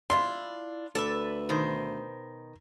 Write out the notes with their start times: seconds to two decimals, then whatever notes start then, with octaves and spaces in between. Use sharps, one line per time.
0.10 D4 E4 F4 C6
0.95 D2 A4 B4 D5 E5
1.49 B2 D#3 C5